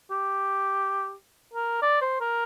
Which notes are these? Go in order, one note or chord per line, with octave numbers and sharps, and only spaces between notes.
G4
A#4
D5
C5
A#4